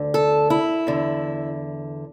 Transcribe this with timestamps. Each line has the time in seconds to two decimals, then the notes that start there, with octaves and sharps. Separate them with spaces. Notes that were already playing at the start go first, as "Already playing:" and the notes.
Already playing: D2 D3
0.14 A4
0.50 E4
0.87 E2 D3